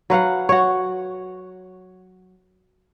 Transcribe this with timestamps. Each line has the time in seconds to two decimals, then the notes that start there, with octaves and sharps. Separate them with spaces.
0.10 F#3 B4 F5 F#5
0.49 F#4 C#5